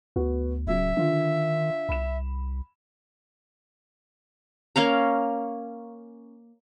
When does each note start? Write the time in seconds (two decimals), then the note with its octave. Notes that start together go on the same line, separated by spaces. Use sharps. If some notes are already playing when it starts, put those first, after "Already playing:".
0.16 D2 B3 F#4
0.67 D1 C#3 F#3 E5
0.97 D3 D#3 F4
1.89 C2 B5 E7
4.76 A#3 C#4 F5 A#5